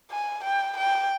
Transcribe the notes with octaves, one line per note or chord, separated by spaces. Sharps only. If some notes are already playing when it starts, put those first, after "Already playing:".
G#5
G5
G5